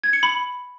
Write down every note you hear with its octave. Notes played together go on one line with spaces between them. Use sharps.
G#6
C#7
B5